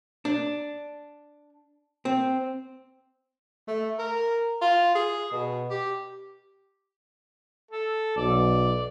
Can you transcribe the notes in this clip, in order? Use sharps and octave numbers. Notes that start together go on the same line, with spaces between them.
D4
C4
A3
A#4
F4
G#4
B2
G4
A4
B1 D5